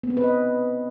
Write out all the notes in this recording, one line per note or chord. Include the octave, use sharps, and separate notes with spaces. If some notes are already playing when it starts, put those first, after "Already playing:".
B3
C4
B4
D#5